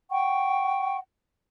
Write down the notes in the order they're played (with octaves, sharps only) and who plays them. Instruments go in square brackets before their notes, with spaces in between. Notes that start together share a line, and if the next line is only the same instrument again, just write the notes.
[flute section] F#5 G5 C#6